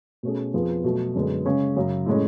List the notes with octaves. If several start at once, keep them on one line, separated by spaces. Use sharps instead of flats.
B2 A3 C#4 G#4
F2 F3 B3 F4 G#4
B2 F#3 A3
F#2 D3 G#3 B3
C#3 G#3 C#4 G#4
F#2 C#3 F#3
A2 G#3 C#4